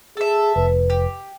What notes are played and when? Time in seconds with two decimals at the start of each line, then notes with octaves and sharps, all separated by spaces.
0.17 G#4 A4 E5
0.56 F1 B4
0.90 G4